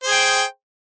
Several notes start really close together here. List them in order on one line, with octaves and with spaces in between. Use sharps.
C5 G#4 G5